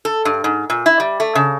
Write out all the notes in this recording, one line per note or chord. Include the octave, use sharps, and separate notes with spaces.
A4
G2
G#2
A#2
E4
G3
A3
C#3